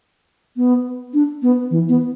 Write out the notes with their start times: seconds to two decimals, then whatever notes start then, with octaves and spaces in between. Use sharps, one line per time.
0.57 B3
1.14 D4
1.42 B3
1.71 E3
1.89 B3